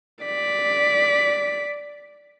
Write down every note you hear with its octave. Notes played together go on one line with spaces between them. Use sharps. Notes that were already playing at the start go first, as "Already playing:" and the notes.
D5 B6